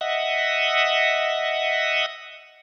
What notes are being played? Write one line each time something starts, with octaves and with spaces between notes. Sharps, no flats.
D#5 E5 F#5